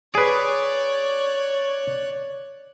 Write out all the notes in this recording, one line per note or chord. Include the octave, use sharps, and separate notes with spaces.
G#4 B4 C#5 D5 F#6